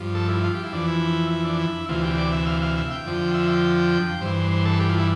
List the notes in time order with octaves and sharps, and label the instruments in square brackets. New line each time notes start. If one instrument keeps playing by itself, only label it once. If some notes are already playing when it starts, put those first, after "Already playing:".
Already playing: [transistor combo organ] G2 F3
A4
E4
F4
G4
E4
F2 E3 D4
E4
E4
D4
E4
D2 C3 E3 F4
G4
D5
E5
F5
F5
E5
G5
F2 D3 F3
E5
G5
G2 E3 C5
C5
A4
G4
F4
E4